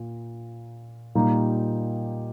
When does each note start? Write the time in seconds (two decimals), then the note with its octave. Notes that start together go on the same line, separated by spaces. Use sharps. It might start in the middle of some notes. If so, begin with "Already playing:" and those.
Already playing: A#2
1.15 A#2 G3 A#3 D#4 G4